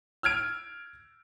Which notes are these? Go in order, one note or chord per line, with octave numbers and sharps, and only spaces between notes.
E6 F6 G#6 D7